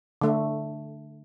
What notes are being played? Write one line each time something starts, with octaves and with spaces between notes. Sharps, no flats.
D3 A3